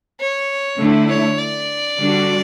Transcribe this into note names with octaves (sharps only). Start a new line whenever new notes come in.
C#5
D3 A3 E4
C#5
D5
D3 G3 D4 F#4